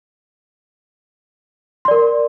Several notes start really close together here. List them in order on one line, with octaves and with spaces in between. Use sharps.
C6 D5 A#4